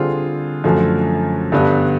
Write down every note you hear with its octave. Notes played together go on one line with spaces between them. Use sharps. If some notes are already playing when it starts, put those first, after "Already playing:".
Already playing: D3 G3 C4 F4 G#4
F#2 D3 F3 A3
G2 D3 G3 B3